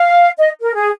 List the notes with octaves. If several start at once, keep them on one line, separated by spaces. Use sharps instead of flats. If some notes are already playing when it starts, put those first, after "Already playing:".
Already playing: F5
D#5
A#4
G#4